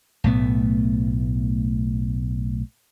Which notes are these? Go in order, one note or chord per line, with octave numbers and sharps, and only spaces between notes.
B1 A2 A3 B3